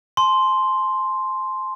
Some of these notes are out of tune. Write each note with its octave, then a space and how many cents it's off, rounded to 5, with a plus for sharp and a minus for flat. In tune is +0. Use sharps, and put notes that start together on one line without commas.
A5 -45 C6 +0